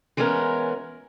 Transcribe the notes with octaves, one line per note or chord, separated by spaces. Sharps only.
E3 G#3 B3 C#4 G#4 A#4